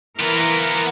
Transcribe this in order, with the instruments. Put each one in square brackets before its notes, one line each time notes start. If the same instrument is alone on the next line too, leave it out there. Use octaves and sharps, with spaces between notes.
[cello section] E3 A#4 [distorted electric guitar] B3 F4